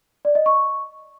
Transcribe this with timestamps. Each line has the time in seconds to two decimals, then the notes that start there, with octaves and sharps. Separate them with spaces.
0.25 D5
0.35 D#5
0.46 C#6